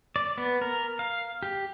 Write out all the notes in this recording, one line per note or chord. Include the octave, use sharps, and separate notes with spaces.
D5
B3
A#4
F5
G4